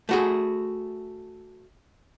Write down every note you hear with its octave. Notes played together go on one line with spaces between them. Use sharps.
A3 F#4 G#4